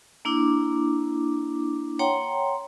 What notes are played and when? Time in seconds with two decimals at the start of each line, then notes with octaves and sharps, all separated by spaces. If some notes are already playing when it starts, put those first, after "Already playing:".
0.25 A#3 D4 E4 D6
1.99 C#5 F#5 G5 A#5 C6